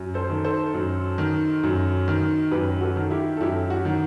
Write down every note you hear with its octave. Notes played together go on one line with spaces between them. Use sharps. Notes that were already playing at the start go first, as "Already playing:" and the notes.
Already playing: F#2
A4 C5
D#3
A4 C5
F#2
D#3
F#2
D#3
F#2 G4 B4
F#4 A4
D#3
E4 G4
A4
F#2 E4 G4
F#4
D#3